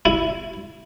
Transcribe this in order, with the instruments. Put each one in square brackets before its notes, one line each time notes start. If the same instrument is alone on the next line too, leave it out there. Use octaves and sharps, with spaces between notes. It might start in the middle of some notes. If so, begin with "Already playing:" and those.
[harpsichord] E4